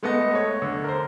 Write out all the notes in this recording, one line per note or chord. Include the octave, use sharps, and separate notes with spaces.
G#3 A3 B3 A4 D#5
A3 C#5
D3
A#4 C5